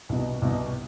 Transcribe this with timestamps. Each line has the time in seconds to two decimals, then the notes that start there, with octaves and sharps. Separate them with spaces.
0.09 C2 B2
0.42 C2 B2